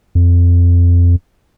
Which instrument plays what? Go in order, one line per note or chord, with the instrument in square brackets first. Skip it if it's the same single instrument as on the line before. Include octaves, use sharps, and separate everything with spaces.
[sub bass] F2